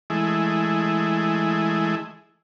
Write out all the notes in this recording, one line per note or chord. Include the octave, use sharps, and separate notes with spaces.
E3 G#3 A3 E4 G#4 D#5